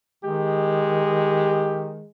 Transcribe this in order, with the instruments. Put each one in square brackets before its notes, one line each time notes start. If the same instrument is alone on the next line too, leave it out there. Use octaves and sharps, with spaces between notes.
[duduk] D#3 [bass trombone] G#3 [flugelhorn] G4